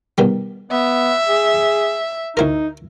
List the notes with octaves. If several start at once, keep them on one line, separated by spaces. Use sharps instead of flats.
B2 D#3 G3
B3 E5
G#4
D2 D#4 E4 A#4